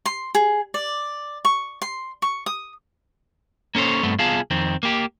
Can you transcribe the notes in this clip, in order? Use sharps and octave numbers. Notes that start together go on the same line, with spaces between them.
C6
G#4
D5
C#6
C6
C#6
D#6
A#3 C#4 A4 C5 C#5
G2 A3 B3 C4
C2 B3 F4 G#4 F5 A5
F2 D#3 C4
A#3 G4